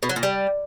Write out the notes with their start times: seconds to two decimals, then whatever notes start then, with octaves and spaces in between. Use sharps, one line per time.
0.03 B2
0.09 F#3
0.16 A#2
0.23 G3